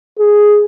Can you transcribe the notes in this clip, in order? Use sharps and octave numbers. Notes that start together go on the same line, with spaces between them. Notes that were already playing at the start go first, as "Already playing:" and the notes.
G#4